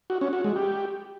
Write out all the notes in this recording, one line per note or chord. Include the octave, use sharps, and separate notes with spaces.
F#4
C#4
F#4
G#3
G4